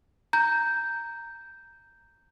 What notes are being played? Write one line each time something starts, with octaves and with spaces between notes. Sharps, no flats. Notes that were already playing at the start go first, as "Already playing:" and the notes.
A#5 G6